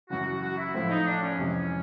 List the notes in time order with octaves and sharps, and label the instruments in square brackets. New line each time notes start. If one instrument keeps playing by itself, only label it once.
[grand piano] F#2 C#3 E3 [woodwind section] F#4
[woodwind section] F#4
F#4
E4
[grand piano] A2 F3 A3 C4 [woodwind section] E4
[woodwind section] D#4
D4
C#4
[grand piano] F2 C3 E3 G#3